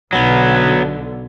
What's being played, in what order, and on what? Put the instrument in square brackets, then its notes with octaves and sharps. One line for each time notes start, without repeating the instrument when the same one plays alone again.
[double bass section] B1 B2 D3 [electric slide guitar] F#3 B3